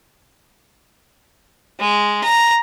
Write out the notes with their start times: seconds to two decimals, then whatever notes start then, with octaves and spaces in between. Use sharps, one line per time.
1.80 G#3
2.24 A#5